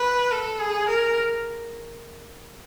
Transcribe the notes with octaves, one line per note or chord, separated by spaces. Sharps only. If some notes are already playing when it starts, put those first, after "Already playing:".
Already playing: B4
A4
G#4
A#4